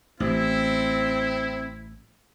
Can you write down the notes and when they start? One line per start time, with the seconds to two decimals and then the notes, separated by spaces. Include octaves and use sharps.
0.20 A1 C4 E4